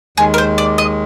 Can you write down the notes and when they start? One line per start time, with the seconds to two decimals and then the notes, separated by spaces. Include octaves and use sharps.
0.17 D#2 D#3 G#3 G#4
0.34 A#4
0.38 C5
0.58 D5
0.78 D#5